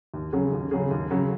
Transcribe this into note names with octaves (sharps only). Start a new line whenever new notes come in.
D#2
C#3 F#3 C#4 G#4
D#2
C#3 F#3 C#4 G#4
D#2
C#3 F#3 C#4 G#4